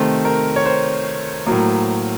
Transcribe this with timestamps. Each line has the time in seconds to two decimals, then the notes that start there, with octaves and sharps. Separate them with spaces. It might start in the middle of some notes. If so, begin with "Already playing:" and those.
Already playing: C3 D#3 A3 C5
0.25 A#4
0.56 C#5
0.66 C5
1.46 A2 F#3 A#3